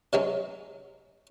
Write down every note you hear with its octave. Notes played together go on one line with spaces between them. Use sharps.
C3 E3 F#3 G#3 C4 C#4